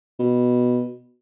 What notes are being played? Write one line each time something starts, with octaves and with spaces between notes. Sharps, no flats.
B2